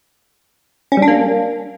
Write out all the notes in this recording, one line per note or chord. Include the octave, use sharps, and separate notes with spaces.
C#4
G3
D4
A#3